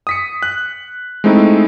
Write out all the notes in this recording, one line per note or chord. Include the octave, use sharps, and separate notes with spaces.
D#6 B6 C#7
F#6
G#3 A3 C4 D#4 E4